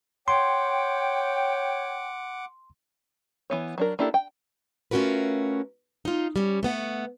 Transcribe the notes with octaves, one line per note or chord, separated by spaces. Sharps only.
C#5 F#5 G5 C6 D6
E3 B3 C#5
F#3 D4 A#4
A#3 D4 E4 G4 A4
G5
A3 C#4 F4 F#4 A#4 B4
D#4 F4
G3 C#4
A3 B3 F#5